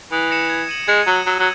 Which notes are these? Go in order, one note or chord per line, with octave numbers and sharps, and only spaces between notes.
E3 D#6
A#6 C#7 E7
G#6
D#7 F#7
G#3 G#6
F#3 D#7 F#7
F#3 E6
F#3